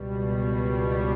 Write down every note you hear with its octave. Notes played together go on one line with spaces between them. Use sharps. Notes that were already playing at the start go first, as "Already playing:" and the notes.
Already playing: C#2 B2 G3